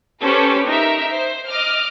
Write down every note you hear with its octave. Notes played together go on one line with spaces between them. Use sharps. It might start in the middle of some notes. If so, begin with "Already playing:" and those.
C#4 G4 A4 B4 C5
D#4 A#4 E5
C5
D#5 D6 F6